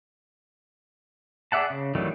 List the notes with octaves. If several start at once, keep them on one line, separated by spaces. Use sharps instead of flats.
G#4 D5 E5 F#5 A5
C#3
D#3 E3 F#3 G3 A3